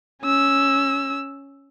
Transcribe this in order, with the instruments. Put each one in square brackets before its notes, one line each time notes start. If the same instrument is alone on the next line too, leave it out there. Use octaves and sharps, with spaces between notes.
[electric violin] C#4 E6